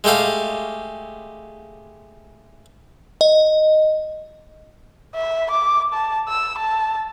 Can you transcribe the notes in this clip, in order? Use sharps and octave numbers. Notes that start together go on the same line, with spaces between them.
G#3 A3 G4 A4 F5
D#5
E5
D6
A5
E6
A5